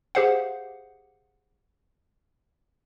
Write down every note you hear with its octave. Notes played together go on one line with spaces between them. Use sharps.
G4 G#4 C5 F5 F#5